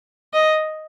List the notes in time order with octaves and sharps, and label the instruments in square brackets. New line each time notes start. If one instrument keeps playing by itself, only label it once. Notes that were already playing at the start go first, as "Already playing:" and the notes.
[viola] D#5